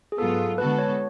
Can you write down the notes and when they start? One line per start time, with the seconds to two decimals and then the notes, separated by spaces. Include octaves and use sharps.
0.12 G#4
0.18 G#2 F#3 B3 F4 A4
0.58 D3 G#3 B3 F#4 A4 B4
0.78 C#5